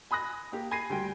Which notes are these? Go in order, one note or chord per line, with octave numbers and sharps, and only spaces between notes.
G#5 B5 D#6 F#6 A#6
A#3 G4
G#5 B5 G#6 A#6 C7 D#7
D2 G3 G5